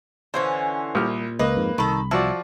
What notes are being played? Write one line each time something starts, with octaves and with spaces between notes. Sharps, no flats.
D3 E3 C#4 C5
C2 A#2 G4 F6
C#2 A#3 B4 D#5
F2 G#2
C2 D#3 A4 B5
F3 E4 F#4 D5